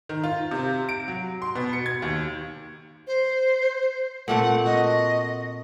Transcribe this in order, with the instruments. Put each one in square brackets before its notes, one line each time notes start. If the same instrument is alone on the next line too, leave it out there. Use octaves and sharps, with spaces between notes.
[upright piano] D#3
F4
C3
D7
F#3
C6
B2
C#7
G#6
D#2
[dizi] C5
[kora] A#2 A3 C4 [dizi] F#5
[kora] F#4 [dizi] D#5